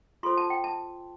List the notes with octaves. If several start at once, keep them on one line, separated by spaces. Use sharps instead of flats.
F4 A4 C5 C6
A5
G5
A5